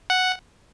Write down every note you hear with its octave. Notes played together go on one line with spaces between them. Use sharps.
F#5